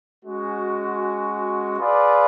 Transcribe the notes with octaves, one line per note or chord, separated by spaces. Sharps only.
G#3 C#4 F#4
F4 G#4 B4 D5